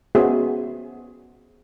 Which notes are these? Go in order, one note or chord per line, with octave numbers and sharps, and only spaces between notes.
B3 C#4 F#4 G#4 C5 E5